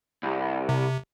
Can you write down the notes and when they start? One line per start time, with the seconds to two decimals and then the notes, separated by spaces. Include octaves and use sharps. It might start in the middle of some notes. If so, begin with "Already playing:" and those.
0.23 C2
0.69 C3